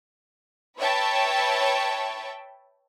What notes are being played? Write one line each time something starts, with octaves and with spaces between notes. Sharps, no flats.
B4 C#5 E5 G5 A5